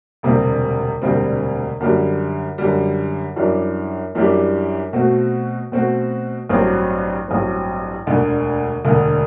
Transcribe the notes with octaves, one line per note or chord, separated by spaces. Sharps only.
E1 D2 C3 G3 C4
E1 D2 C3 G3 C4
F#2 D3 G3
F#2 D3 G3
F#2 E3 G3 D4 G4
F#2 E3 G3 D4 G4
B2 A3 C4 F#4
B2 A3 C4 F#4
A1 G2 F#3 C4
A1 G2 F#3 C4
E1 D2 D3
E1 D2 D3